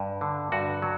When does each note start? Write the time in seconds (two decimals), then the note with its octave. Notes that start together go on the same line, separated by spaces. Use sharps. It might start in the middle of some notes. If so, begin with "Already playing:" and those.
Already playing: G2
0.21 D3
0.52 G2 F#4
0.82 F#3